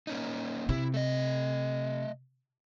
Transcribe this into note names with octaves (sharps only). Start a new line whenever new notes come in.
A#3 C#4 D#4
C3 E4
A3 D#5